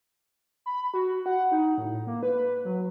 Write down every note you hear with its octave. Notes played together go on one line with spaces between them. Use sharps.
B5
F#4
F#5
D#4
A2
A#3
B4
F#3